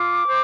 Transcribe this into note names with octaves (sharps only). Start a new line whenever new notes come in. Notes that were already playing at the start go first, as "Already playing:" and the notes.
Already playing: F4 D6
C5